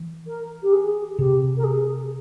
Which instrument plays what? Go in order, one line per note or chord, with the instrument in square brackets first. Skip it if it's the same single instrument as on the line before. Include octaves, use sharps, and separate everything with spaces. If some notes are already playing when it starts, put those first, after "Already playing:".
Already playing: [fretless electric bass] E3
[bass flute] A#4
G4
G#4
[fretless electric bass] C3 [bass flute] G4
[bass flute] A#4
G#4